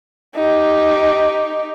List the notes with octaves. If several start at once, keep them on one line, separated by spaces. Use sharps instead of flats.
D#4 G4